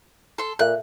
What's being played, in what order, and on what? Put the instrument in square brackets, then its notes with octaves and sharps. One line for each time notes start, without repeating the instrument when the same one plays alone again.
[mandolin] A4 C6
[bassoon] A#2 [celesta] A4 E5 F5 [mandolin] F#6